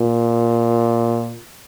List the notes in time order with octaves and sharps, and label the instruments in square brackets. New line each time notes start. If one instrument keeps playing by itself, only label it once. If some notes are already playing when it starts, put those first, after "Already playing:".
Already playing: [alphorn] A#2